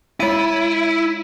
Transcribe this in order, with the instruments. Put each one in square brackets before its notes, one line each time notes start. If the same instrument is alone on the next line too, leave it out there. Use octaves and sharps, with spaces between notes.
[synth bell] G#3 D#7 [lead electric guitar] E4